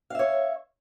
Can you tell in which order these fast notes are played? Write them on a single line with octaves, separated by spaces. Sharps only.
F5 E5 C#5